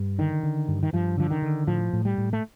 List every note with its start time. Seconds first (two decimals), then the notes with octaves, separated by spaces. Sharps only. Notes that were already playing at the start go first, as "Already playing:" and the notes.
Already playing: G2
0.19 D3 D#3
0.43 D3
0.68 G2
0.83 D#3
0.93 G2 F3
1.17 D3 F3
1.30 D#3
1.42 D3
1.67 A2 F3
1.93 A2
2.05 G3
2.18 A2
2.33 A3